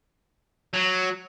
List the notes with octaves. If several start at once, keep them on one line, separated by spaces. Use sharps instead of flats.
F#3